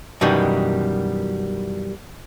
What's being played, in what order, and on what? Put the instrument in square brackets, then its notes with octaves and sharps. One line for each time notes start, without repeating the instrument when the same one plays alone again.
[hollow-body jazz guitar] F#2 B2 D#3 E3 G3 D#4